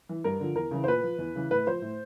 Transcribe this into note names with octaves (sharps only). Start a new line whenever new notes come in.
E3
G2 A#4
D3 F3
E2 A#4
C#3 E3
C5
A#2 B4
F3
E2
C#3 E3
A2 B4
F3 C5
A2